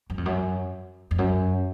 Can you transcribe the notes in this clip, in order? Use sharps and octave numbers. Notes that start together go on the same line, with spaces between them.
F#2
F2
F#2
F2
F#2